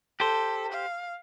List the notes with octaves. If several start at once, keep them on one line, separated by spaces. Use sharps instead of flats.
G4 A4 C5
F5